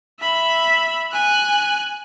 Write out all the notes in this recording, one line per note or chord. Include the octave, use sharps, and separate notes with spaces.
E5 B5
G#5 F#6